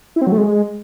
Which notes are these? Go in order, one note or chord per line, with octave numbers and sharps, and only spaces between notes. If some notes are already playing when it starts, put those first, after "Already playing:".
E4
C4
F#3
A3
G#3